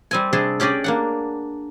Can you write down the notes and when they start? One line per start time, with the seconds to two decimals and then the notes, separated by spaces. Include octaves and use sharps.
0.11 G3 C4 G#5
0.33 C3 G3 D4 G#4 A5 C6
0.60 C#4 G4 G#4 D5 D#5
0.84 A#3 D4 F#5